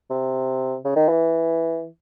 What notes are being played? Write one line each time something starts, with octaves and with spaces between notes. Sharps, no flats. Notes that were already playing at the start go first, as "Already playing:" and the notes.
C3
C#3
D#3
E3